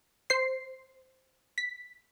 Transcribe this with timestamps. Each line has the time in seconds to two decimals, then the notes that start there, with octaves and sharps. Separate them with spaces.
0.30 C5 C7
1.58 B6